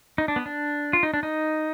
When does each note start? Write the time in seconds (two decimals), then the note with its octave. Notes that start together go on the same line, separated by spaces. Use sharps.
0.18 D#4
0.28 D4
0.36 B3
0.46 D4
0.93 F4
1.03 D#4
1.14 D4
1.23 D#4